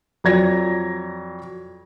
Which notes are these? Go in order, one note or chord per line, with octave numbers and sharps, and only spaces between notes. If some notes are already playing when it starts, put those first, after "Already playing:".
F2 F#3 D5 G#6 A#6